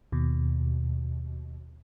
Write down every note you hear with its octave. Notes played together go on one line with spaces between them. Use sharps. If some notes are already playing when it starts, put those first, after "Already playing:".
D#2 B2